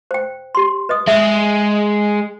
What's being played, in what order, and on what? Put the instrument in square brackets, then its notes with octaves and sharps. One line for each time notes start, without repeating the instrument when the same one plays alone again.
[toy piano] C5 G5
G4 C6
B4 D#5 D#6
[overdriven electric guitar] G#3 [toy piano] E5 E6